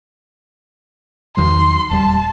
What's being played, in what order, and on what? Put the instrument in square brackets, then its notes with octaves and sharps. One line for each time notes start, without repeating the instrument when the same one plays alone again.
[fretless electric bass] E2 D#3 F#3 [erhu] C6
[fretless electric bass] D#1 G3 [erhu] A5